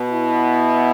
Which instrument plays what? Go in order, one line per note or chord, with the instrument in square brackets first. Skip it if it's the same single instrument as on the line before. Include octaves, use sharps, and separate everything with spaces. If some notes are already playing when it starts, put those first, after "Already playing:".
Already playing: [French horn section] B2 B3
E4